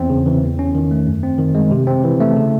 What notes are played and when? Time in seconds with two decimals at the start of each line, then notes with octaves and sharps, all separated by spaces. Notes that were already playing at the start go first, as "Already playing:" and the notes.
Already playing: E2 C4
0.10 C#3
0.26 E3
0.43 E2
0.59 C#4
0.75 D#3
0.91 A3
1.07 F#2
1.23 C4
1.38 D#3
1.55 G#3
1.71 C3
1.87 C4
2.04 E3
2.20 A3
2.37 C#3